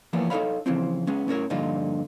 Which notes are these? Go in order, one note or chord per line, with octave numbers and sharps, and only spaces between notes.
E3 F3 A#3 B3
D#4 A4 B4 C#5 F5 B5
C#3 E3 F3 C4
G#3 B3 C#4
A2 C#4 A#4 C#5
G2 A#2 D3 F3 D#4 F4